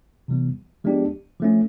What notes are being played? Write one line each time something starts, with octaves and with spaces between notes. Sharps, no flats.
C3 E3 G3 B3
F3 G#3 B3 D4 G4
F3 A3 C#4